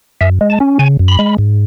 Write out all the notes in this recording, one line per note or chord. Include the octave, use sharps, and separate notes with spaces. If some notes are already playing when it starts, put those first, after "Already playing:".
F#2 E5
G#3
A5
C#4
C#3 G#5
F#2
B5
G#3
G#2